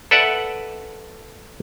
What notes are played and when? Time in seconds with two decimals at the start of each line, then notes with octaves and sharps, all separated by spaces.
0.11 A4 B4 D5 E5 F#5